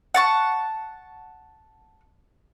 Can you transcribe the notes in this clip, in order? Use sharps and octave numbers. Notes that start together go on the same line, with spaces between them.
F#5 A5 C#6